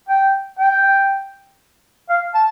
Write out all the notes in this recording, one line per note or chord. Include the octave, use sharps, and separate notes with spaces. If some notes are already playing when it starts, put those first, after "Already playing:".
G5
G5
F5
A5